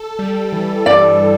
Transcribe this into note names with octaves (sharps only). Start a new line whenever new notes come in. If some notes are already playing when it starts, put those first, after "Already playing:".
Already playing: A4
G3
E3
G2 D5